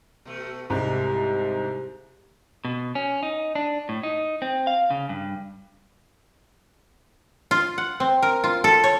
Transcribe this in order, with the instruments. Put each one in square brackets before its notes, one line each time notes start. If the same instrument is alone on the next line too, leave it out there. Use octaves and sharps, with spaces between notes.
[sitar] B2 A3
[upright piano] C2 G#2 [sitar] G4
[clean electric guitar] B2
C#4
D#4
D4
A2
D#4
C4
F5
C#3
G2
[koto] F4
F#5
C4
A#4
F4
A4
C#5